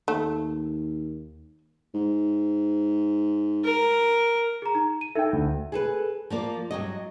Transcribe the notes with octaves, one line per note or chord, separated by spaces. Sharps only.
D#2 A3
G#2
A#4
G#4 A#5
D#4 A#5
D#7
D#4 A4 E5 G5
D2
G#4 A4 B4
F3 A#3 D5
G2 F#3 D#5